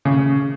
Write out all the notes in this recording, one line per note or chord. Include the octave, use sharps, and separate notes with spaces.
C#3